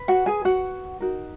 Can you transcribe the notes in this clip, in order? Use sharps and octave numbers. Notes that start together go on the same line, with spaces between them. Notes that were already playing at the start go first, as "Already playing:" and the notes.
Already playing: B4
F#4 F#5
G#4 G#5
F#4 F#5
D#4 F#4 A#4